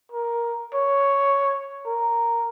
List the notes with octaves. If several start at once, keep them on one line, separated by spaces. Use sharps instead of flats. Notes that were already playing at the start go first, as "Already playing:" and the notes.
A#4
C#5
A#4